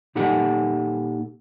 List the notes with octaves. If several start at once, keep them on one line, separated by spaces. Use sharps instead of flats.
A#2 D#4 G4 A4 F#5